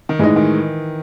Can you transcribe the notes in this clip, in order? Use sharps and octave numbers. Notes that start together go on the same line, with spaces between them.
D#3
A2 E3 G#3 D#4
D#3